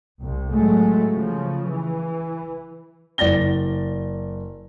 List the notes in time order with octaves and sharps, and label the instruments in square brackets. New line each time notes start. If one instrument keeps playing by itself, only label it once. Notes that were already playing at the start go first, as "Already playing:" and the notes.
[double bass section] C2
A2 F#3 G#3 A3
C#3 F3
E3
[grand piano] F#1 D5 A6 A#6 G7